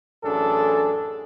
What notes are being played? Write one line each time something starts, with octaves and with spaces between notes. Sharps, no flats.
A1 F#2 D4 G#4 A4